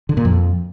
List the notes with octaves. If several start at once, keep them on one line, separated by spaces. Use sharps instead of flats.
D3
A#2
F2